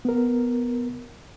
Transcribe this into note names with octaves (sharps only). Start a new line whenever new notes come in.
B3 A#4